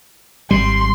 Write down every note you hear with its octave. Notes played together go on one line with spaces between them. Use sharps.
G#1 G3 C6